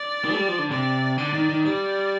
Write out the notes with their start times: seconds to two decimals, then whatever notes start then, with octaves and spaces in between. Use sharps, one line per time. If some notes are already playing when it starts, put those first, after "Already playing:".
Already playing: D5
0.25 D#3
0.33 A3
0.37 G3
0.48 F3
0.59 D3
0.71 C3 D5
1.18 D3 D5
1.34 D#3
1.49 D#3
1.65 G3 D5